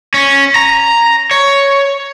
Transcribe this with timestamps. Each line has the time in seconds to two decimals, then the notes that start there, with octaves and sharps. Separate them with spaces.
0.14 C#4
0.56 A#5
1.31 C#5